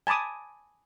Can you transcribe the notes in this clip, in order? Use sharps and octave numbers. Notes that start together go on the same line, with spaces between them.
G#5 A5 B5 D6 D#6